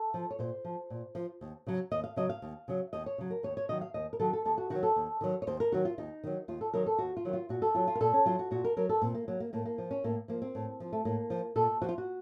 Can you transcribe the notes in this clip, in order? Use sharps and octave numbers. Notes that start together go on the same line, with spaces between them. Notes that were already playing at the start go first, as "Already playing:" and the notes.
Already playing: A4
F3
C#5
A#2 C5
F3
A#2
F3
D#2
C#3 F#3
D#2 D#5
F5
C#3 F#3 D#5
F5
D#2
C#3 F#3
D#2 D#5
C#5
C#3 F#3
A#4
D#2 C#5
C#5
D#3 F#3 D#5
F5
D#2 D#5
A#4
D#3 F#3 A4
A4
D#2 A4
F#4
D#3 F#3 F#4
A4
D#2
D#3 F#3
C#5
D#2 C5
A#4
D#3 F#3 F#4
F4
D#2 D#4
D#3 F#3
D#2 F4
A4
D#3 F#3 A#4
A4
D#2 F#4
F4
D#3 F#3
F4
A#2 F#4
A4
F#3 F4
F4
A#4
A#2 A4
C#4
F#3 F4
F#4
A#2 F#4
A#4
F#3 A#4
A4
A#2 C4
A#3
F#3 A#3
A#3
A2 A#3
A#3
F3
C#4
A2 A#3
F3 A#3
C4
A2
F3
A3
A2 A#3
F3
A#2 A4
F3 F#4
F4
F#4